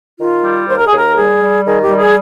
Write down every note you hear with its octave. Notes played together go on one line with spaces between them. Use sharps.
D#3 F4
G3
D#2 C5
A#4
G#4
D#2 A#4
G3 G#4
G3
D#3 G#4
G4
G3
G#4